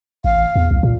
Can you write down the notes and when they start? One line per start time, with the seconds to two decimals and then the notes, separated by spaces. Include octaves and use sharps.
0.24 A1 F5
0.56 E2
0.71 C2
0.83 A#2